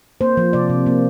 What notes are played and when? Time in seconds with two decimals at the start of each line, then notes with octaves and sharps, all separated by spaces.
0.21 A#3 C5
0.37 F3
0.53 C3 D5
0.69 C3
0.86 A#3